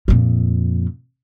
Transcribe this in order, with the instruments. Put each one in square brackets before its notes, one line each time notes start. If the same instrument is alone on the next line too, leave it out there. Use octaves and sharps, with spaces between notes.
[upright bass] F2 A#2